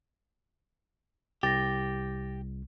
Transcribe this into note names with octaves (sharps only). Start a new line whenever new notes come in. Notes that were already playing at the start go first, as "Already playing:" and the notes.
C2 G4 A6 A#6